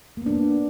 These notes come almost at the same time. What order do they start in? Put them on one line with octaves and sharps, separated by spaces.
A#3 B3 D4